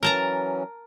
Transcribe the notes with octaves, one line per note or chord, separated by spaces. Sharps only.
E3 F#3 C#4 A#4 A5 A#5